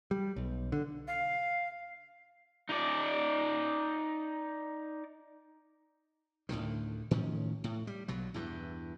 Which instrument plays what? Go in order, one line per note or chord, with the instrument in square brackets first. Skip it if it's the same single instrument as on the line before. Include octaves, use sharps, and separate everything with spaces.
[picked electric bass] G3
B1
D3
[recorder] F5
[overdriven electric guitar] D#4 D5
[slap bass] D2 A2 D3 D#3
A2 D#3 F3 C#4
A2
G3
B1 B2 F#3
E2 G2 E3